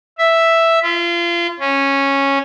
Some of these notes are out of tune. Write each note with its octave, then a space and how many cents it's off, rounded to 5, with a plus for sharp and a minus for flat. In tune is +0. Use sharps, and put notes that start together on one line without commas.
E5 +0
F4 -30
C#4 -10